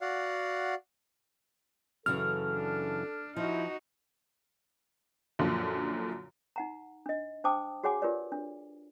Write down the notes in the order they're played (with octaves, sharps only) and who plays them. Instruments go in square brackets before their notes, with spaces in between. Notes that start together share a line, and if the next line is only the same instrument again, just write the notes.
[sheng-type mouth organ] F#4 D5 F5 F#5
[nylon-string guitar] F#2 C#3 E3 [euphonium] A4 [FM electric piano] F6
[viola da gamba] D4
[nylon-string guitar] F3 [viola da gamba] D#4 F#4 [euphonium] E4
[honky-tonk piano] F#2 A#2 D3 F3
[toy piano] D#4 F#5 A#5
D4 D#5
D4 C5 G5 A5 D6 D#6
F#4 G#4 C#5 F#5 G#5 D6
F4 G4 A#4 B4 C#5 D5
D4